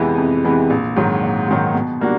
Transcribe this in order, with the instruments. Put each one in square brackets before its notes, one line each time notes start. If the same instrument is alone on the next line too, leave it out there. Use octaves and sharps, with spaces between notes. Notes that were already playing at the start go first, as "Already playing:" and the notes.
Already playing: [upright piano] F2 C3 E3 G#3 B3
F2
C3 E3 G#3 B3
A#1
G#2 D#3 F#3
A#1
G#2 D#3 F#3
B2
G3 A#3 D4 F#4